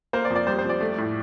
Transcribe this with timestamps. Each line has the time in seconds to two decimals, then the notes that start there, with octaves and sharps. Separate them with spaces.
0.13 A#3 C5
0.25 D5
0.30 F2
0.36 D5
0.47 G3 C5
0.58 C5
0.64 F2
0.69 D5
0.81 A3
0.98 A2